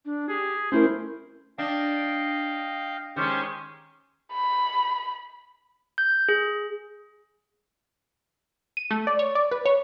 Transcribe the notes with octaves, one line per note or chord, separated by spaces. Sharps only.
D4
G4 G#4
A3 C#4 E4 A#4 C5
D4 D#5 F5 G5
D#3 G#3 C#4 G4 C5
B5
G6
G#4
D#7
A3
D5
C#5
D5
B4
C#5